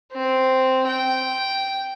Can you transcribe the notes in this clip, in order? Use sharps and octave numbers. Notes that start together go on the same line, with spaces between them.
C4
G5